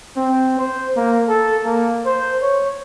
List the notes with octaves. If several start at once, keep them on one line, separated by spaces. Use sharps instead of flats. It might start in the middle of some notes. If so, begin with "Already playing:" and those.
C4
C5
A#3
A4
A#3
C5
C#5